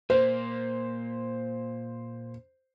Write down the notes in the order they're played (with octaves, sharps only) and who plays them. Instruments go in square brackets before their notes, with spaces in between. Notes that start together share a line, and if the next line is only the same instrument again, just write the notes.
[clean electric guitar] A#2 A#3 [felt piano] C5